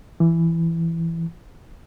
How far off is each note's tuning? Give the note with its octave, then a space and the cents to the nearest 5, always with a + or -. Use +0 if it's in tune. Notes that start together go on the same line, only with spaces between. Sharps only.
E3 +10